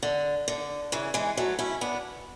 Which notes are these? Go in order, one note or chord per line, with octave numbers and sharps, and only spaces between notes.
D3
D3
C#3 E3
E3 G#3
F#3 A3
C#4 E4
B3 D4